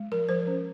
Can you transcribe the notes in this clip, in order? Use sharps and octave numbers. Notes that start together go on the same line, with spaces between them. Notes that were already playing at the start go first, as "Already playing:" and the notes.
Already playing: G#3
F3 A#4
F3 C5
C#4